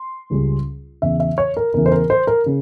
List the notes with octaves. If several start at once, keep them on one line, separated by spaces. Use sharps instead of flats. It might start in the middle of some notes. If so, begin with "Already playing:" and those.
Already playing: C6
C#2 C#3 G3 C#4
E2 C#3 E3 E5
E5
C#5
A#4
E2 C#3 E3 A#4
C5
A#4
C5
A#4
C#3